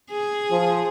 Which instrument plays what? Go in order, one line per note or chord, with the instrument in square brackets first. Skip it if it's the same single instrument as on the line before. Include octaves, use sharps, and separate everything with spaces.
[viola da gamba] G#4
[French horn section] F3